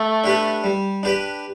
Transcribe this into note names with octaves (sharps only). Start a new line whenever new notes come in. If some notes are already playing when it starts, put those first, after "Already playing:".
Already playing: A3
D4 G4 B4
G3
D4 G4 B4